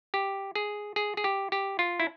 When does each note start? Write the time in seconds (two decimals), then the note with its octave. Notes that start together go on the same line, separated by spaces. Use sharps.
0.14 G4
0.55 G#4
0.96 G#4
1.17 G#4
1.24 G4
1.52 G4
1.79 F4
2.00 E4